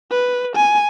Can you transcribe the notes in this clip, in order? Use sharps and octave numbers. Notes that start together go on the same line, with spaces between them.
B4
G#5